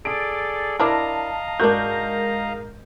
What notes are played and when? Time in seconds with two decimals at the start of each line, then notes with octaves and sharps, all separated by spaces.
0.05 G#4 A4 D5 D7
0.80 D4 E4 A#4 D#5 F5 A5 A#5
1.60 G#2 D4 F#4 A#4 G6